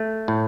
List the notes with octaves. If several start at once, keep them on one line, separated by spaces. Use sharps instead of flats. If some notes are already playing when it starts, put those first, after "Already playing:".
Already playing: A3
A2